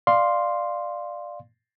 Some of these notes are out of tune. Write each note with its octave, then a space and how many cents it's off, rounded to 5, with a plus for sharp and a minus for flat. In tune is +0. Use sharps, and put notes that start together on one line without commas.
D5 +15 F5 +0 C6 +0